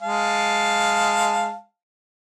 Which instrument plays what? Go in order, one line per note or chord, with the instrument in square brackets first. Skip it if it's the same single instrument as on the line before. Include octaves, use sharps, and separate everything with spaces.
[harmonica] G#3 F5 A5